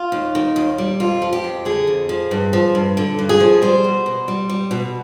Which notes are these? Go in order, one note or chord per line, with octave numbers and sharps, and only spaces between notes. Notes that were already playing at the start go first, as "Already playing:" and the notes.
Already playing: F4
D#2
D#3
D#2
G3
F2 F4
F3
G4
F2
D3 G#4
F2
F3
G2
F3
G2
D3
G2
G#4
F3
G3 C5
B2
B2
G3
G3
B2